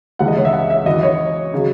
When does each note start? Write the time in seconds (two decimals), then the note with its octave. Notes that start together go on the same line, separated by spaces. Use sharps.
0.19 C#2 C#3 E3 F#5
0.28 D#5
0.37 C#5
0.45 E5
0.53 F#5
0.70 E5
0.86 F#2 E3 D#5
1.03 C#5
1.54 C#3 F#3